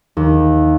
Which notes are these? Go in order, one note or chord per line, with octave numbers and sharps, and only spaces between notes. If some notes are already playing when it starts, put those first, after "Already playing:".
D#2